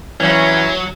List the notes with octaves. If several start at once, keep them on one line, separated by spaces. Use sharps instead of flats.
E3 F#3 C#4